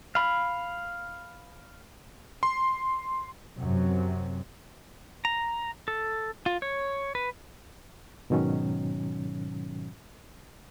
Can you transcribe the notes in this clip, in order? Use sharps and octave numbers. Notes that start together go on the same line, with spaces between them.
F5 B5
C6
F#2 C3 F#3
A#5
A4
F4
C#5
B4
G#2 B2 D#3 F#3 C#4